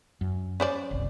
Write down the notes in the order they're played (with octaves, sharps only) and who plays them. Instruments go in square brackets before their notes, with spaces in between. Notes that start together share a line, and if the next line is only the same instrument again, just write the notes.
[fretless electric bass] F#2
[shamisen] C#4 C5 D5
[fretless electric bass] F#1 C2